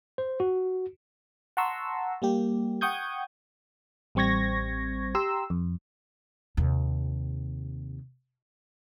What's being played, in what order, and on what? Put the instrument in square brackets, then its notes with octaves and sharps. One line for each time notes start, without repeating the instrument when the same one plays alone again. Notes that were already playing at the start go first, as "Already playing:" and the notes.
[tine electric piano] C5
F#4
[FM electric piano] F#5 A5 A#5 C6 C#6 E6
G3 A#3 G4
F#5 G5 C#6 D#6 G6 G#6
A1 G3 C4 C#6 G#6 A#6
G4 A#5 C6 E6
F2
[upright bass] D#2 C3